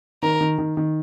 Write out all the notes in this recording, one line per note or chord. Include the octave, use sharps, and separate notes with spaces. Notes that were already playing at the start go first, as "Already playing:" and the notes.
D#3 A#4
D#3
D#3
D#3